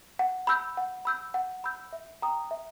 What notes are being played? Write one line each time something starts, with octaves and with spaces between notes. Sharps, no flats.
F#5
B5 E6 G6
F#5
B5 E6 G6
F#5
B5 E6 G6
E5
G5 A#5 D#6
E5